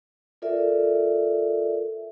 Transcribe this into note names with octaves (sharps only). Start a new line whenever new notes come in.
F4 A4 A#4 D5 E5